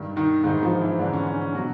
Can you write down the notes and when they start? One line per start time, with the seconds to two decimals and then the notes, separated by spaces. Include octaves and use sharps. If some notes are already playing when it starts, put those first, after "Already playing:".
Already playing: G2 D#3
0.16 D#3 D#4
0.44 G#2 D#3 E3 D#4
0.63 F3 F4
0.81 E3 E4
0.99 G#2 D3 E3 D4
1.13 C#4
1.26 C#4
1.41 C#4
1.55 B2 F#3 F#4